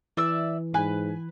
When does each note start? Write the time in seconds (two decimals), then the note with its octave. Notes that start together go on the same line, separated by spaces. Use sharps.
0.17 E3 D5 E5 E6
0.74 G#2 B4 G#5